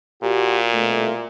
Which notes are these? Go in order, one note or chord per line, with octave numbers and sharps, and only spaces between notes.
A#2 F#4 G4
C2 B2 A3